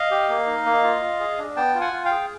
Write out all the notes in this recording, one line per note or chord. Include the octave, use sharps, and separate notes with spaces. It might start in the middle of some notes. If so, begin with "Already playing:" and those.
Already playing: D#5 F5
G4
A#3
D#4
A#3
F4
F4
G#4
D4
B3 G5 A5
F4
F#5 G#5
F4
F5 G5
G#4